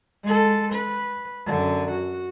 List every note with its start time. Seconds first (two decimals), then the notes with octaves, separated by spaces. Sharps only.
0.24 G#3 A4
0.72 B4
1.46 F#2 D3
1.90 F#4